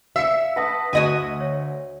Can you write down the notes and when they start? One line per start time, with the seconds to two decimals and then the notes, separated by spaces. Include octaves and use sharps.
0.16 E5 F5 C7 C#7
0.56 B4 F#5 A5 D#6 A#6 B6
0.93 D2 F#4 D#5 G#5
1.40 C#5